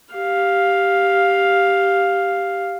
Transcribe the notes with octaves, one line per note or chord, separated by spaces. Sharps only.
G4 F5